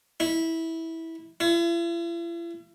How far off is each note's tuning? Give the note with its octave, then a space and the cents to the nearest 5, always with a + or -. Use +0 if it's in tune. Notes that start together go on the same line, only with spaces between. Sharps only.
E4 -15
E4 +45